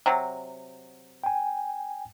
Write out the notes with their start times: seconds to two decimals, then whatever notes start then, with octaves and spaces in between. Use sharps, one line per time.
0.06 C3 F#3
1.24 G5 G#5